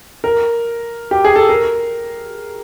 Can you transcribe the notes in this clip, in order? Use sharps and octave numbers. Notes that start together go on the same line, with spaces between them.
A#4
G4
G#4
A4
A#4